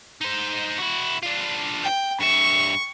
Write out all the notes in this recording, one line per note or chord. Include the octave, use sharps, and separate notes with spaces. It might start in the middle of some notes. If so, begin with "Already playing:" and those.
D#4 C5
E4 F#4
D4 F4
G5
G2 E5 C#6